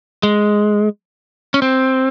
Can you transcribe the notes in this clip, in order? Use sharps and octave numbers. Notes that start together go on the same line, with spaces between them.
G#3
C#4
C4